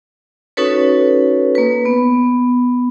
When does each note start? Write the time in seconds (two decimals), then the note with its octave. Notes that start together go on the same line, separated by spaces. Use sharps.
0.57 C#4 D#4 F#4 A4 B4 C#5
1.55 A#3 B4
1.85 B3